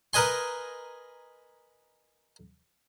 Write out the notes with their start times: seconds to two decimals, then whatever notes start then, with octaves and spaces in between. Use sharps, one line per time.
0.13 A#4 B4 D#5 G#5 C6